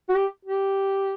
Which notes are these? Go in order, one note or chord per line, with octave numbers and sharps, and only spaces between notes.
F#4
G4
G4